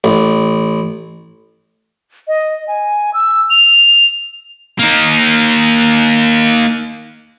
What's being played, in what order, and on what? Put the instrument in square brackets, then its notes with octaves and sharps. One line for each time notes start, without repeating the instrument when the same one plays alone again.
[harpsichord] A1
[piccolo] D#5
G#5
E6
F7
[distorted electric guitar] A#3 D#4